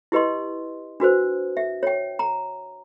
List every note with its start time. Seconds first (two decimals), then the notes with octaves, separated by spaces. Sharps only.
0.12 E4 G4 B4 D#5 C6
1.00 D4 F#4 B4 C5
1.57 E5
1.83 C#5 G5
2.19 A#5